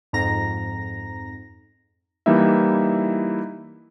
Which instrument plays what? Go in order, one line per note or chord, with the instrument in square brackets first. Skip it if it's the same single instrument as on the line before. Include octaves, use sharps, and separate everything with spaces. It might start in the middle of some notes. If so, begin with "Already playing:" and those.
[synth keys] F2 G#2 A#5 A#6
[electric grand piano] E3 G3 A#3 D#4 E4 E5